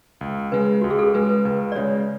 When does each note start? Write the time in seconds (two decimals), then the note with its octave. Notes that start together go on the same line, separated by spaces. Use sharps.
0.21 C#2
0.52 C#3 G#3 B4
0.81 C#2 F#4
0.90 G#4
0.99 A4
1.14 C#3 G#3 B4
1.29 B4
1.45 C#2 B4
1.72 D5
1.75 C#3 G#3 C#5